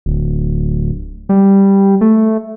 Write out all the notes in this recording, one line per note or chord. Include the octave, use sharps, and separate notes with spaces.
D1
G3
A3